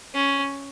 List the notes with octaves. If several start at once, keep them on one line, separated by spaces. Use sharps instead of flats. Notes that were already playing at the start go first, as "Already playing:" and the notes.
C#4